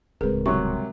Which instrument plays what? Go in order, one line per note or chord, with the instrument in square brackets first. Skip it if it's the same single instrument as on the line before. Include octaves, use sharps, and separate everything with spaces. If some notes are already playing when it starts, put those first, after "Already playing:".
[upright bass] D1 C#2 [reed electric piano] G#3 C4 A#4 [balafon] G#4 B4
[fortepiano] C3 F#3 [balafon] G3 C#6